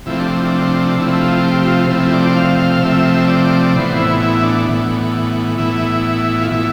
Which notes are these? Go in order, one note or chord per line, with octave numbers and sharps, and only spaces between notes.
C3 F3 A3 C4 E4
D4
D4
C3 F3 A3 C4 E4
F4
G4
F4
C3 F3 A3 C4 E4
D5
F5
F5
C3 F3 A3 C4 E5
D5
A2 E3 B3 C5
E4
E4
D4
A2 E3 B3
A2 E3 B3 E4
F4
A2 E3 B3 E4